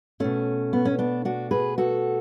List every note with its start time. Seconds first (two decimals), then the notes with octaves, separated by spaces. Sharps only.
0.20 B2 A3 C#4
0.73 B3
0.85 C#4
0.99 B3 D4
1.25 D4 F#4
1.51 G#4 B4
1.78 F#4 A4